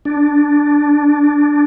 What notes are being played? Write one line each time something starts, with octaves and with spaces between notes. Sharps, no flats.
D4